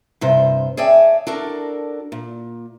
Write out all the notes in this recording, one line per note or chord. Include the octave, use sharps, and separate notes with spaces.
G2 C3 C5
G#4 C#5 D5 E5 G5 A5
D4 F#4 A4 A#4 D5
A#2